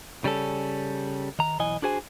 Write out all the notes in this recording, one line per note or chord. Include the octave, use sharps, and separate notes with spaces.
C#3 G3 C#4 A4
D#3 A#5
B1 E3 D#5 G#5
D4 F#4 G#4 C5 G#5